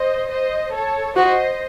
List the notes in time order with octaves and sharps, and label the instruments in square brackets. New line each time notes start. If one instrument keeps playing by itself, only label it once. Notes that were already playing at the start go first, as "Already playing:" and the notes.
Already playing: [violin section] C5 D#5
C5 D#5
A4 C#5
[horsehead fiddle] F#4 [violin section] C5 D#5